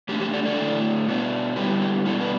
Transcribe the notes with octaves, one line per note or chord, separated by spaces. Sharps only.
E3 A3 D4 G4
G4
A4 D5
A4 D5
D3 A3 E4
B2 B3 D4
D3 G3 B3 E4 G4 B4
G4
B2 G3 B3 D4 E4 A4
B4